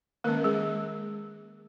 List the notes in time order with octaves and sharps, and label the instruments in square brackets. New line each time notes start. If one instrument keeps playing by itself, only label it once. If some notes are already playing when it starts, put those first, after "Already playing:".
[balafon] D#3 G#3 A#3 C#4 A#4
G#3 G#4